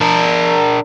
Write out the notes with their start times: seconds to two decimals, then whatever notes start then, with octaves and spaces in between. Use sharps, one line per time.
0.01 D4 A#4